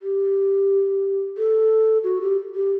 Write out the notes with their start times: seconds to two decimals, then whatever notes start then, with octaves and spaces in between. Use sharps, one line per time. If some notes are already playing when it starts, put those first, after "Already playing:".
0.02 G4
1.38 A4
2.04 F#4
2.21 G4
2.55 G4